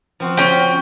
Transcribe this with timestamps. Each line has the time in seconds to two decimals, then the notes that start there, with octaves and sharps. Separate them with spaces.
0.20 F3 C4 F#4
0.37 C#4 G5